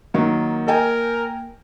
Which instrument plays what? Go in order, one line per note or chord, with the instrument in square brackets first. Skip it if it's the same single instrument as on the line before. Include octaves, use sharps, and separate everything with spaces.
[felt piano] D#3 F#3 [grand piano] A#3
[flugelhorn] A#4 [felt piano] D#5 G5 G#5